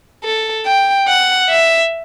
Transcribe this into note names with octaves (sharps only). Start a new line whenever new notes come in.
A4
G5
F#5
E5